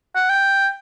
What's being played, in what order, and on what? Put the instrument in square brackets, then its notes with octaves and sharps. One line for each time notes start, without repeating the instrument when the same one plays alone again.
[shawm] F#5
G5